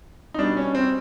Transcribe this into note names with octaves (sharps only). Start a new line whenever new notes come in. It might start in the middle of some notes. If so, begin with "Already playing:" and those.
D#4
B2 G3 D4
C#4
C4